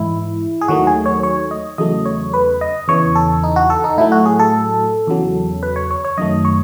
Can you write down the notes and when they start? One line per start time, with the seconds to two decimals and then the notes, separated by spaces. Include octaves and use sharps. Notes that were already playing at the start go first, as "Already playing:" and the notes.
Already playing: G#2 E3 G#3 E4
0.61 G#4
0.68 D#2 D#3 F#3 A3 F#4
0.87 G#4
1.06 C#5
1.23 C#5
1.51 D#5
1.78 E2 C#3 F#3 A3 D#5
2.05 C#5
2.34 B4
2.61 D#5
2.88 E2 C#3 E3 C#5
3.15 A4
3.43 D#4
3.56 F#4
3.70 A4
3.84 D#4
3.98 A2 F#3 A3 E4
4.12 F#4
4.26 G#4
4.39 A4
5.07 E2 C#3 F#3
5.63 B4
5.76 C#5
5.91 C#5
6.04 C#5
6.18 F#2 D#3 F#3 A3 D#5
6.45 C#5